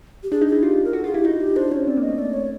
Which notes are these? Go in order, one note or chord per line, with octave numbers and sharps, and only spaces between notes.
G4
D4 G#4
D#4
E4 G#4
F4 G4
A#4
F#4 A4
F4 G#4
E4 G4
D#4 F#4
G4
D4 C5
C#4 C#5
C4 D5
A#3
D#5
A3
A3 D5
C#5